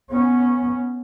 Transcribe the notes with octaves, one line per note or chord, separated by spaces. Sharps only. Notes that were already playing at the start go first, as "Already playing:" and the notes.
B3 C#4